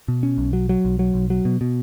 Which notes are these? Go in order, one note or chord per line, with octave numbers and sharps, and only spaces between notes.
B2
C#4
B1
F#3
F#3
B1
F#3
B1
F#3
B2
B2